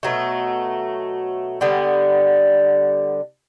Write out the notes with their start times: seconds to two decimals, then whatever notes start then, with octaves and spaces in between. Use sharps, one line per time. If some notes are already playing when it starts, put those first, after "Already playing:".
0.03 B2 F#3 A3
1.61 D3 G3 B3